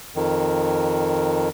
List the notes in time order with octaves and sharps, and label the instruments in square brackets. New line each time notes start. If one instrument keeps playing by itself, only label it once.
[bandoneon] F2 D#3